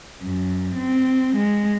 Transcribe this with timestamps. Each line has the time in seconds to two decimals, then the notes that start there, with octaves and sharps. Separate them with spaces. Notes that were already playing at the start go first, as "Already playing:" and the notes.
0.23 F#2
0.76 C4
1.38 G#3